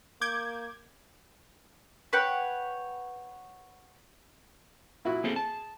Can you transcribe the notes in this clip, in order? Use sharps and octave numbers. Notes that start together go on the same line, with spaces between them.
A#3 D6 G6 G#6
B4 C#5 F#5 G5
A#2 E4 F#4
A#3 C4 G#4 A4
A5